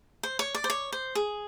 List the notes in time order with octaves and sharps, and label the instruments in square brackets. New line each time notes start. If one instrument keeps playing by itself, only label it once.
[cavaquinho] C5
C#5
D5
C5
C#5
C5
G#4